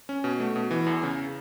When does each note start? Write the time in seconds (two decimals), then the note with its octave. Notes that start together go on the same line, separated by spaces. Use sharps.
0.09 C#4
0.24 B2
0.40 A3
0.56 B2
0.71 E3
0.87 E2
1.03 C#3